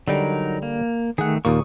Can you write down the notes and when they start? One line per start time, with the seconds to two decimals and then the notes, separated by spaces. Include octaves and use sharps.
0.08 D3 F#3 G3 D#4 A#4
0.62 A#3
1.18 D#3 A3 G#4 F#5
1.45 D#2 A#2 A#3 C#6 D#6